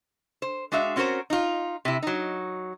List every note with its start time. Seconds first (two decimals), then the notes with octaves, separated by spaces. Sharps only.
0.42 C5
0.72 G#3 D4 F#4 E5 F5
0.96 C4 C#4 F#4 A#4 C5
1.30 D#4 F4
1.85 C3 E4
2.03 F#3 D#4